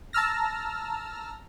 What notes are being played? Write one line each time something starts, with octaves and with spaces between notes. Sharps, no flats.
A5 A#5 E6 F6 A#6